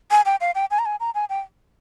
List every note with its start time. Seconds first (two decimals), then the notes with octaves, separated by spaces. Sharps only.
0.11 G#5
0.25 G5
0.41 F5
0.55 G5
0.71 G#5
0.79 A#5
0.86 G#5
1.00 A#5
1.14 G#5
1.29 G5